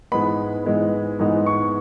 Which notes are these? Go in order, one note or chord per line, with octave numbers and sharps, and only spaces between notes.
G#2 E3 G#3 B3 B5
G#2 E3 G#3 B3
G#2 E3 G#3 B3
C#6